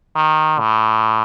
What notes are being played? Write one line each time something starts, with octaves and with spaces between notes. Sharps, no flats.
D#3
A2